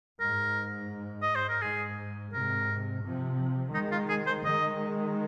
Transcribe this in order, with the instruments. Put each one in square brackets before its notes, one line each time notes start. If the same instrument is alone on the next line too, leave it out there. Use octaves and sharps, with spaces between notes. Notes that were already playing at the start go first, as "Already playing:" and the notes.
[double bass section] G#2 [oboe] A#4
[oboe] D#5
C5
A#4
[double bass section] G#2 [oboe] G#4
[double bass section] G#2 C3 [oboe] A#4
[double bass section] C3 F3
[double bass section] D#3 G#3 [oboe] D#4
[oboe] F4
G#4
C5
[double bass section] D#3 G#3 [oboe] D#5